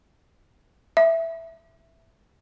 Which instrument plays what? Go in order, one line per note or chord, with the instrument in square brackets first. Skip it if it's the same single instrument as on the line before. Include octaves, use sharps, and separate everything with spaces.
[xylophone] E5